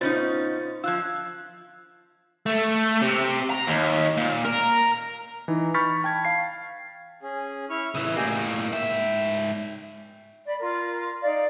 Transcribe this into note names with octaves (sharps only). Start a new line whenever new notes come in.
B2 C#4 D#4 F4 C5 A6
F3 F4 E6 F#6 G#6
A3
C3
A#5
D#2
A#2
A#4
E3 D#4
B5 C#6 F6 G6 A6 B6
G5 A5 G#6
F5 C7
C#4 G#4
E4 C#6 F6
C#3 E3 E5
A2 A#3 G4 G#4 D#5
G5 C#6
G#2 E5 G5
D5 B5
F4 A#4
D#4 D5 F5